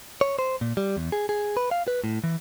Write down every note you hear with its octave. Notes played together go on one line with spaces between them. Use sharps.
C#5
C5
A#2
G3
E2
G#4
G#4
B4
F5
B4
A2
E3